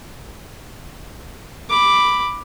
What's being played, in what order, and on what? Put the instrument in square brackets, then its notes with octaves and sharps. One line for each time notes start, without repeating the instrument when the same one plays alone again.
[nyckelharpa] B5 D6